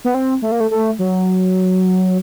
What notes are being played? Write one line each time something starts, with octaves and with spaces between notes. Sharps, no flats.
B3
C4
A3
A#3
A3
A3
F#3